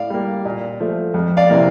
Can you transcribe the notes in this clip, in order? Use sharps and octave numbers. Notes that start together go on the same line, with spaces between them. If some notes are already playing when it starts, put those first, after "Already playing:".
Already playing: A2 D5 F5
G3 A#3
A#2
F3 A3
F2
D5 F5
C3 E3 A#3